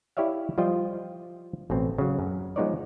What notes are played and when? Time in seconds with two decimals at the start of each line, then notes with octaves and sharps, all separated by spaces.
0.17 E4 G4 C#5 D5 E5 F5
0.58 F3 G3 F4 D#5 G5
1.70 A1 B2 C4
1.98 C#3 F#3
2.19 F#2
2.56 F3 G#3 B3 D#4 C#5 D5